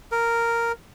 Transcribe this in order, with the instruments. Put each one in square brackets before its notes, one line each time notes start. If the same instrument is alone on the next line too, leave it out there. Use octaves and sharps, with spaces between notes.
[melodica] A#4